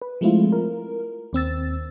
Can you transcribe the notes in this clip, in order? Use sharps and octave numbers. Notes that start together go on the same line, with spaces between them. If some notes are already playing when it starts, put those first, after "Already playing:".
B4
F3 G#3 A3 C4 E4 F4
A#4
D#2 C4 E6 A6